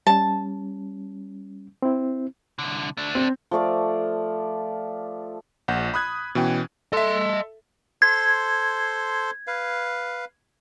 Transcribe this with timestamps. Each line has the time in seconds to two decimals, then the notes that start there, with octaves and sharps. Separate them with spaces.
0.07 G3 C#4 A5
1.82 C4 E4
2.59 C2 D3
2.97 A3 D4
3.15 C4
3.51 F3 A3 D5 D6
5.68 A#1 F#5 G6
5.94 B5 D#6 F#6 G#6
6.35 B2 E3 C#4 G5
6.93 A4 D#5 E5 C6
8.02 A4 C5 C6 G#6
9.47 B4 F5